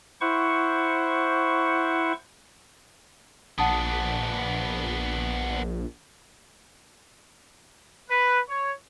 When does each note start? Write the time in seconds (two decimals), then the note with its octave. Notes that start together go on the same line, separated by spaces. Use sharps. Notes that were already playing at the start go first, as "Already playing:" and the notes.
0.21 E4 C5 F#5 C#6
3.58 A#1 B3 D4 F#5 A5 D#6
8.09 B4
8.48 C#5